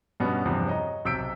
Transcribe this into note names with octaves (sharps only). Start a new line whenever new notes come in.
G2 B2 G3 B3 C#4
E2 G2 C3 F3
C#5 D#5 A#5
B1 C3 E6 G6 B6 D7